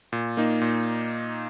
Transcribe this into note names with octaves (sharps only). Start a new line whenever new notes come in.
A#2
A#3 D#4
A#2